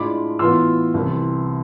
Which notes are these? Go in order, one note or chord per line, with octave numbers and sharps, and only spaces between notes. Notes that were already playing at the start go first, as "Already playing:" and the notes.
Already playing: A2 G#3 D4 F4 B5 D6
A2 E3 B3 F4 C6 E6
C2 C3 E3